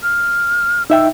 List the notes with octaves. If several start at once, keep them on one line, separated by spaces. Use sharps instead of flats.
F6
D#4 E5 G5 E6